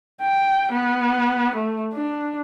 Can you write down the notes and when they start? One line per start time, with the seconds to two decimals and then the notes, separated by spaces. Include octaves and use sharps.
0.21 G5
0.72 B3
1.56 A3
1.93 D4